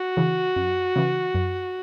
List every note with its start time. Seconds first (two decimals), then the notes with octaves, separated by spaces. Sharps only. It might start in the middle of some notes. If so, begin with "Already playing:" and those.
Already playing: F#4
0.17 C#3 E3
0.56 F#2
0.96 C#3 E3
1.35 F#2